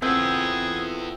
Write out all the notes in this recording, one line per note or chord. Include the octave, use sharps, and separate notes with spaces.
B3 C4 E4 F4 G#4 A4 F#5 G5